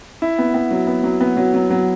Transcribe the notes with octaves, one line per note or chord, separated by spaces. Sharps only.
E4
B3
B3
F#3
B3
F#3
B3
F#3
F#3
F#3